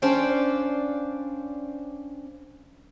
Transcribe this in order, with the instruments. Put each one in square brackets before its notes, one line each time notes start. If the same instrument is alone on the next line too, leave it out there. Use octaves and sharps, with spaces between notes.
[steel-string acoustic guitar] C#4 D4 C5 D5 F5 G5